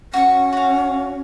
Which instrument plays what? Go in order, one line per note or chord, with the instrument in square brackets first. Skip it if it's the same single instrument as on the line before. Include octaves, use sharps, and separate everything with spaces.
[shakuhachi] C#4 [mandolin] F#4 C#6
[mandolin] F#4 F5